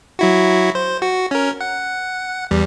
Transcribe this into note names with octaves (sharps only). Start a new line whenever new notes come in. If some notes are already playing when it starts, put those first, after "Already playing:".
F#3 E4 F#4
C5
F#4
C#4 A#4
F#5
E2 G3